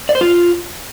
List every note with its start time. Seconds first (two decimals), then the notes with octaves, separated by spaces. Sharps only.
0.09 D5
0.15 C5
0.21 F4